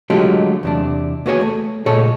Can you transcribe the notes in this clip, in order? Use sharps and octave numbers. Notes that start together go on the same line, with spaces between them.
D3 F#3 G#3 A3 F4 G4
E2 C3 D4
A#3 B3 F#4 G#4 C#5 G#5
A3
C#2 A#2 G#4 A4 C#5 G#5